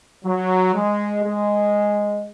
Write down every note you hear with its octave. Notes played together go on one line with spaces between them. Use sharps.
F#3
G#3
G#3